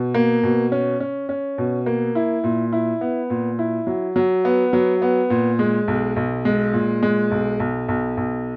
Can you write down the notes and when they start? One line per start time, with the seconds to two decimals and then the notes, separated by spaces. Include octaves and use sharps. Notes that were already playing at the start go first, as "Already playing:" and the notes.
Already playing: B2
0.14 A#3
0.43 B2
0.72 C#4
1.00 C#4
1.29 C#4
1.58 B2
1.86 A#3
2.15 E4
2.44 A#2
2.72 E4
3.01 B3
3.30 A#2
3.59 E4
3.87 F#3
4.16 F#3
4.45 B3
4.73 F#3
5.02 B3
5.30 A#2
5.59 G#3
5.88 B1
6.16 B1
6.45 G#3
6.73 A#2
7.03 G#3
7.31 B1
7.60 B1
7.88 B1
8.17 B1